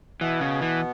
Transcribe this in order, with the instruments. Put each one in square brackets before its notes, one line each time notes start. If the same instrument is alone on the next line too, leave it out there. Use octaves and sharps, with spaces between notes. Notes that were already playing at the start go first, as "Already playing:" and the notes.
[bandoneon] B2 B3 [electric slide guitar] E3
[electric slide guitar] C#3
E3